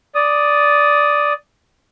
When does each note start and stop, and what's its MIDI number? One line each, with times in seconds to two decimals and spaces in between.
0.15 1.33 74
0.15 1.33 87